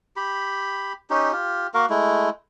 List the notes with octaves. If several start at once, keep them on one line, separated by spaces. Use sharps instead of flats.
G4 B5
C#4 D#4 G4
F4 G4
A#3 F#4 A#4 F5
G#3 A3 E4